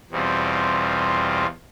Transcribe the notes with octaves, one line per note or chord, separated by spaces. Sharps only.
E2 B2 G3 C4 F4